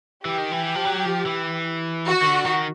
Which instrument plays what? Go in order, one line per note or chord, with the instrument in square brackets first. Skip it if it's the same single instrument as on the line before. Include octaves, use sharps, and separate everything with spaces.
[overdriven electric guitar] E3 [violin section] G4
[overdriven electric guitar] D#3
E3
F3
F#3
F3
E3
[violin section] F#4
[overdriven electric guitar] D#3
D3
D#3